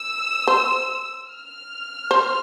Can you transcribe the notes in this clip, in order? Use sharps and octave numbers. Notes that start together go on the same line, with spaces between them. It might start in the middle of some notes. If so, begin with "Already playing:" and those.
Already playing: E6
C5
F6
C5